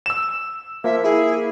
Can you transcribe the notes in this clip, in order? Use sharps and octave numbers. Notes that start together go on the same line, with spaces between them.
E6 E7
F3 A#3 E5
E4 G#4